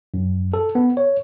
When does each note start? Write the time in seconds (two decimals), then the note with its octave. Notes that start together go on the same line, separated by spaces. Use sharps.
0.14 F#2
0.53 A4
0.75 B3
0.97 C#5